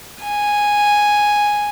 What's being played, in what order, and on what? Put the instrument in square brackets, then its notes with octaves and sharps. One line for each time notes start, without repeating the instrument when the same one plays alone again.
[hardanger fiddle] G#5